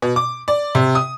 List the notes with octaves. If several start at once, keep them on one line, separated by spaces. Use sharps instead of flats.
B2
D6
D5
C3
D#6